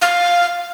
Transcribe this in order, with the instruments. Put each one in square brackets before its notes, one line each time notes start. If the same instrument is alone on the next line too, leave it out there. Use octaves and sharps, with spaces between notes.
[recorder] F5